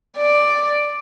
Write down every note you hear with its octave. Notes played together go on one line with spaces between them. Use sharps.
D5